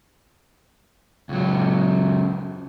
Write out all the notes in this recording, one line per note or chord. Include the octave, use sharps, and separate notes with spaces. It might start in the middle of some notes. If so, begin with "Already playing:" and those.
C#2 F#3